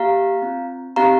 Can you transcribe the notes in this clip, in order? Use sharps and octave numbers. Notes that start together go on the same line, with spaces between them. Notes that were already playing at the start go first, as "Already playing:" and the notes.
Already playing: A#3 G4 F5 A#5
C4 F4
C4 D#4 G4 F5 A#5